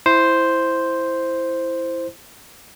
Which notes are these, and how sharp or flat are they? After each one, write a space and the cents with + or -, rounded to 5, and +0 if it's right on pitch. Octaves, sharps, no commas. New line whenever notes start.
E4 +5 C5 +0